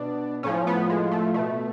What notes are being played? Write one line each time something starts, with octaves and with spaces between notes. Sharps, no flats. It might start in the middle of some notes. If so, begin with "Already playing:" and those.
Already playing: B2 D4
A2 F3 C#4
B3
G#3
A3
B2 A3